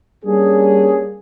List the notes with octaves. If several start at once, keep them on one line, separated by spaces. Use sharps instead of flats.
G3 A#3 C#4 D4 G#4